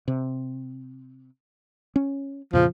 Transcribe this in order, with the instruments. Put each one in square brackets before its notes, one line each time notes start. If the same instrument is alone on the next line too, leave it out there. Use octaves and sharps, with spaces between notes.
[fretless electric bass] C3
C#4
[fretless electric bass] F2 A#2 C#3 [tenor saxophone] F3